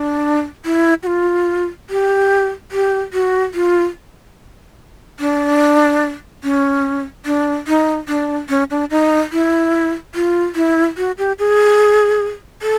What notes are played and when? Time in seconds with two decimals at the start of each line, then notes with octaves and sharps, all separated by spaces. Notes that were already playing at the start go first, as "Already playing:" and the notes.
Already playing: D4
0.65 E4
1.03 F#4
1.07 F4
1.90 G4
2.72 G4
3.13 F#4
3.54 F4
5.20 D4
6.44 C#4
7.26 D4
7.67 D#4
8.08 D4
8.49 C#4
8.71 D4
8.90 D#4
9.32 E4
10.15 F4
10.55 E4
10.97 F#4
11.18 G4
11.39 G#4
12.62 A4